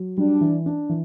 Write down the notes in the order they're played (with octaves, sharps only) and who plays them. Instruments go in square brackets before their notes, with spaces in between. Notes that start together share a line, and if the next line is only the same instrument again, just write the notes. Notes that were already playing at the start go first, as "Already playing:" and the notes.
Already playing: [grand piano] F#3
[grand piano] G3 [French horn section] D4
[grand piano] E3
D4
E3